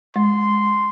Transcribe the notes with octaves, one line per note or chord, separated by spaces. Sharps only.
G#3 C6